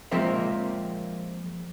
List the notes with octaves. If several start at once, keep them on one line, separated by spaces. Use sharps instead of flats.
F3 G#3 A#3 C4 A#4 E5